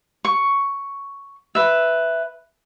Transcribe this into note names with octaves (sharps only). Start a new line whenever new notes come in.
C#6
B4 E5